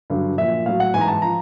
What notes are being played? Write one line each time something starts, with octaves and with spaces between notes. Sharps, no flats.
G2 D3 F#3
A#2 F3 E5
A2 F#3 F5
F#5
G#2 E3 G#5
A#5
A5
F3 A#5